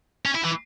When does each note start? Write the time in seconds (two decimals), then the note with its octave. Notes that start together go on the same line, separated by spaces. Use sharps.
0.26 C#4
0.35 E4
0.44 E3